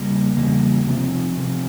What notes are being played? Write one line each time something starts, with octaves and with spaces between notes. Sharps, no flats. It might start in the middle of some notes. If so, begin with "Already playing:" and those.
Already playing: E2 C#3 G3 A#3
E2 C#3 G3 A#3
C3 F3 C4
C3 F3 C4